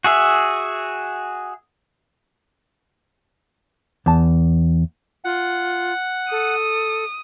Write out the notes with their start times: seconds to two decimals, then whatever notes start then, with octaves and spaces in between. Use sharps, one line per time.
0.04 F#4 G#4 E5
4.06 E2 A5
5.24 F4 F#5
6.31 A4 D#6